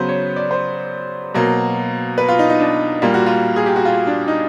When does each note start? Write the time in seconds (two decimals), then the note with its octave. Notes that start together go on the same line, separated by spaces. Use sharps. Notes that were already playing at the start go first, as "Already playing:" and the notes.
Already playing: C#3 F#3 B3 B4 C5
0.09 C#5
0.36 D5
0.51 C5
1.34 B2 F#3 A#3
2.18 B4
2.28 F4
2.39 D#4
2.50 D#4
2.60 D4
3.02 A#2 G3 A#3 F4
3.14 F#4
3.26 F4
3.56 G#4
3.66 G4
3.76 F#4
3.85 F4
4.07 D4
4.28 D#4